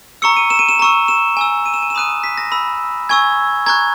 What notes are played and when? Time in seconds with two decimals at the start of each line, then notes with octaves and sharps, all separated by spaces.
0.22 A#5 C#6 E6 C#7
0.37 D#7
0.50 E7
0.59 D#7
0.69 E7
0.79 A#5 C#6 E6
1.08 E7
1.37 G#5 C#6 E6
1.66 D#7
1.74 E7
1.82 D#7
1.90 E7
1.95 B5 D#6 F#6 D#7
2.24 B6
2.38 A#6
2.52 B5 E6
3.09 G#5 C#6 E6 G#6
3.66 A#5 C#6 F#6 G#6